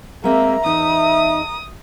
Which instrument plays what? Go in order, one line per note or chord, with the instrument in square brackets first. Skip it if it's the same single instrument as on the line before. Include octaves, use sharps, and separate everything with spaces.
[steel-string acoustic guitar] G#3 C4 [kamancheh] A#3 [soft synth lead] E5 [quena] A#5
[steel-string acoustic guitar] E2 D#4 [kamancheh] D#6